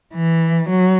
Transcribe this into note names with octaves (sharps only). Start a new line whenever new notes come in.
E3
F#3